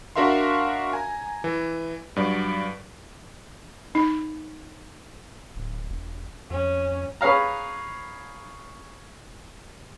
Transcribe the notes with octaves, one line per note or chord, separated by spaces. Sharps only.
D4 F#4 A#4 E5 F5 C6
G#5 A#5
E3
G2 F#3 D5
D#4
D1
E1
F2 C#4
G#4 B4 C#5 F5 A#5